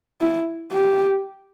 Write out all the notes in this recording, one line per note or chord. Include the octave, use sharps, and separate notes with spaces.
E4
G4